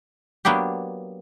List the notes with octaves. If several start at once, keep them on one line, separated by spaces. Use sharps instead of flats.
F#3 A#3 B3 D4 G4